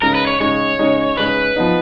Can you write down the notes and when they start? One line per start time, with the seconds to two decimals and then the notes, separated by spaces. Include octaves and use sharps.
0.02 C#3 G#3 D#4 A#4
0.15 B4
0.27 C#5
0.40 C#3 G#3 D#4 C#5
0.79 C#3 G#3 D#4
1.17 C#3 G#3 D#4 B4
1.56 F3 B3 D#4